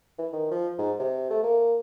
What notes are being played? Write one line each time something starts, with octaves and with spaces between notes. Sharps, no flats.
E3
D#3
F3
G#2
C3
A3
A#3